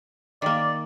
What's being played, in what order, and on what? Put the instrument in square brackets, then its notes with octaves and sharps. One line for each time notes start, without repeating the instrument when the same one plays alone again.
[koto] D#3 A#3 [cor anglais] D5